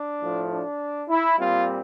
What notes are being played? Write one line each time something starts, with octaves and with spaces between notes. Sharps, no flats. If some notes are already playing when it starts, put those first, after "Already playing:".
Already playing: D4
A2 F3 A3
D4
E4
A#2 G3 C4 F4